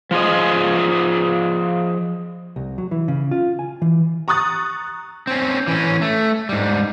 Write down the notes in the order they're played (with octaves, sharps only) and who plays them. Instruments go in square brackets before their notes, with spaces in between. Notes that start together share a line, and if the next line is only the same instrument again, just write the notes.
[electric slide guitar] F3 F4 G#4 D#5
[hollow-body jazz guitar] C2
F#3
E3
C#3
F4
G#5
E3
[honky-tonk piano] A#5 C#6 D#6 F#6 A6
[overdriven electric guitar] C4 C#4
E3 C#4
A3
G#2 G3